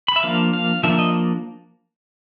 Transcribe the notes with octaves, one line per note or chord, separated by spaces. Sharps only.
B5
E5
F3 A#3 D4 F5
F5
F3 A#3 D4 E5
D#5